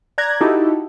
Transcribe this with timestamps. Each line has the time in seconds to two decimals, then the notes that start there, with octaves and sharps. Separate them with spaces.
0.18 D5 A#5 F#6 G#6 A#6
0.40 D#4 E4 F#4 G4 A4